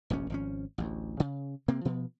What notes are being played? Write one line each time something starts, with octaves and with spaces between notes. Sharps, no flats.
F1 A#1 G2 C#4
G#1 F3 C#4
A1 D2
C#3
C3 A#3 C4
B2 F3 B3